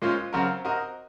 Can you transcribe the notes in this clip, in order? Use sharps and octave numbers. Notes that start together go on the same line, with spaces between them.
A#2 G#3 C#4 F4 C5
C#3 F#3 C4 F#4 A#4
C4 F#4 A#4 D#5